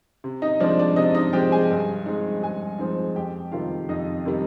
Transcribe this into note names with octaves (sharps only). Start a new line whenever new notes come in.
C3
D#4 D#5
F3 G#3 C4 D4 D5
D4 D5
C3 D#4 D#5
D#4 D#5
F3 G#3 C4 G4 G5
G#4 G#5
G2
F3 G#3 C4 D#4
G2 G#4 G#5
F3 G#3 C4 D#4
F2 G4 G5
C3 D#3 G3 F4 F5
F2 D#4 D#5
C3 D#3 G3